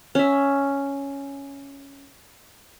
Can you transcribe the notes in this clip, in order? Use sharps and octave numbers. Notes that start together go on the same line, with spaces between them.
C#4 E5